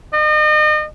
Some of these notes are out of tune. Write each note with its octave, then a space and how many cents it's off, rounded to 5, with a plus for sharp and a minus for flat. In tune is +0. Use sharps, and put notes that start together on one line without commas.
D#5 -40